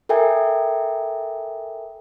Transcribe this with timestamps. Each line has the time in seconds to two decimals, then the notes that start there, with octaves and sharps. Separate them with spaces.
0.09 A4 A#4 E5 G5 G#5